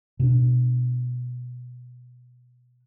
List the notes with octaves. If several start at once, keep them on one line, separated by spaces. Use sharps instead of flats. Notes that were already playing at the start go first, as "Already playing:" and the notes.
B2 D4